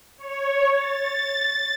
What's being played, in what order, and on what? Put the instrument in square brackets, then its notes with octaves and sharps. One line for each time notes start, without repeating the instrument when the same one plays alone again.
[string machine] C#5
A6